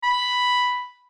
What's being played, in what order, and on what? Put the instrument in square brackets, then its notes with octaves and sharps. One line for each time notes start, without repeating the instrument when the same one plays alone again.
[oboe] B5